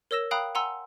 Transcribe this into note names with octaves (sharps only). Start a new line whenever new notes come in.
A#4 C#5 E6 A#6 E7
F5 G5 A#5 B5 D#6 F#6
F#5 G#5 A#5 C6 E6